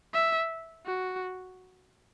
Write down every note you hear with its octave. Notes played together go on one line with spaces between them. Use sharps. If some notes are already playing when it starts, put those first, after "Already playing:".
E5
F#4